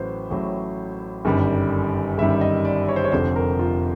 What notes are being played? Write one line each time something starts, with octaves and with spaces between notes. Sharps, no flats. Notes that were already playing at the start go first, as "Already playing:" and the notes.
Already playing: A1 A2 F#3 B4 C5
A1 A2 F#3
G1 F#2 D#3 G3
G1 F#2 D#3 G3 E5
D#5
D5
C#5
C5
C#5
F1 F2 D3 F3 C5
A#4
F4